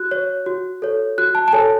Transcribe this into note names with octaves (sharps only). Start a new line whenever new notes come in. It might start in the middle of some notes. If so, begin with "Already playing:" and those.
Already playing: F#4 F#6
C#5
F#4
A4 C#5
F#4 F#6
A5
A5
A4 C#5 G#5